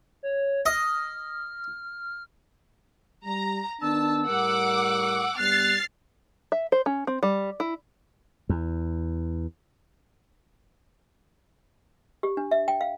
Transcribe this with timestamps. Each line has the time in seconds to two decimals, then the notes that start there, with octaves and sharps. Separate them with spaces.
0.23 C#5
0.66 D#5 F6
3.25 G3 A#5
3.82 D#3 B3 D4 A5 E6
4.28 A2 G3 A#4 F#5 D6
5.38 G2 G3 B3 F6 F#6 A6 C7
6.52 E5
6.72 C5
6.86 C#4
7.07 C4
7.23 G3
7.60 E4
8.49 E2
12.23 G4
12.37 D4
12.51 E5
12.68 G5
12.81 F5